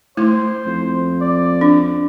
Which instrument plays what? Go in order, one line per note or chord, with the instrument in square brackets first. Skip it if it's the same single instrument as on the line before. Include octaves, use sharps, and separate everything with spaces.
[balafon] A3 E4 [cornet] C5
[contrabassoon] F2
[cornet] D5
[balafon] D4